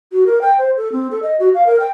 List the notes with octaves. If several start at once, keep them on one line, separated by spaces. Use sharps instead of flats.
F#4
A#4
G5
C5
A4
C4
A4
D#5
F#4
F5
A#4
G5